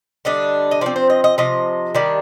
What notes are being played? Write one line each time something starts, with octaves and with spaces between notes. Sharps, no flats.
D3 G3 D4 D#5
D#5
F3 C4 D5
C5
D#5
D#5
C3 F3 D#5
D#3 G3 D4